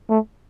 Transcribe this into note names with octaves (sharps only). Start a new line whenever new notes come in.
A3